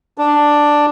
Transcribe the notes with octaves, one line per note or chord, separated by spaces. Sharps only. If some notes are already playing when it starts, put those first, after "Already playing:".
D4